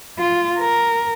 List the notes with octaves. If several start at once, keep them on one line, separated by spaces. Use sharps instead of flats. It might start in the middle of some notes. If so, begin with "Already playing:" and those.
F4
A#4